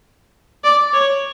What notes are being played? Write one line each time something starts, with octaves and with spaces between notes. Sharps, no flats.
D5
C#5